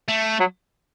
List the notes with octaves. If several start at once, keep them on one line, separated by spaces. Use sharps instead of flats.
A3
F#3